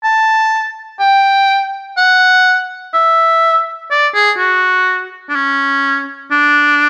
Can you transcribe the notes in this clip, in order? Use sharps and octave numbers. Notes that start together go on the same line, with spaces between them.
A5
G5
F#5
E5
D5
G#4
F#4
D4
C#4
D4